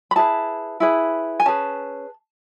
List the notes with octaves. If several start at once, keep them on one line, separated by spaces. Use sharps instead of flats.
B5
E4 G#4 B4 A5
E4 G#4 B4
G#5
C#4 G#4 B4 A5